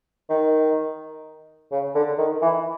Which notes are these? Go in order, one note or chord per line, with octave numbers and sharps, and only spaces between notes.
D#3
C#3
D3
D#3
E3